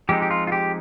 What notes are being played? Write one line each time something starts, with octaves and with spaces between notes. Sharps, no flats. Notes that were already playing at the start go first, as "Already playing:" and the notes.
F3 G#3 C4 D#4 G4
G4
F4
F4
G4